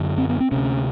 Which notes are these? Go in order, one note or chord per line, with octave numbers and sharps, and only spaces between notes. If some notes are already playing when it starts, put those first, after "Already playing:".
Already playing: F#2 D3
C4
B3
C4
D2 C3 C#4